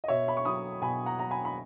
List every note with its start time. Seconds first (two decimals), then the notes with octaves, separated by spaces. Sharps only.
0.04 D#5
0.08 B2 C#5 E5
0.28 B5
0.37 C#6
0.45 F#3 B5 D#6
0.82 B2 G#5 B5
1.06 F#5 A#5
1.19 F#3 A#5
1.31 G#5 B5
1.45 B5